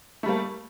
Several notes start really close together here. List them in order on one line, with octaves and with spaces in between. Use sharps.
A3 G3 A#3